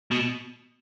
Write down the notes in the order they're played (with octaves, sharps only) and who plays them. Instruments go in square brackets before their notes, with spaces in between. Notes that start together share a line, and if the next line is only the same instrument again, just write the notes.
[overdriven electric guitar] B2